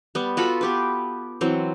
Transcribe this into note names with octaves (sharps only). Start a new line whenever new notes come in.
G3 B3
F4 F#4 A4 B5
B3 G4 B4
E3 F#3 C4